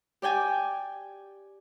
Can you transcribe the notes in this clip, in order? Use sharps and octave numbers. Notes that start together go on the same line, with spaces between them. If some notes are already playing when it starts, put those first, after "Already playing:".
G4 D5 G5 G#5